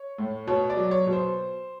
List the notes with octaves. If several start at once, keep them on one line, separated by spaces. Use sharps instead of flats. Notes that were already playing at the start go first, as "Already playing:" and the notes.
Already playing: C#5
A2
B2 C#5
D5
F#3
C#5
B2
C5